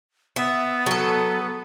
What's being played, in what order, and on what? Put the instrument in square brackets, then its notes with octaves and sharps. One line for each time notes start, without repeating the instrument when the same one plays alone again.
[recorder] B3 [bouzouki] E5
[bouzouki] F#3 A4